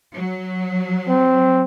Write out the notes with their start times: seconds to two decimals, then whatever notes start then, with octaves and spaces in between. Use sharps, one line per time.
0.14 F#3
1.08 C4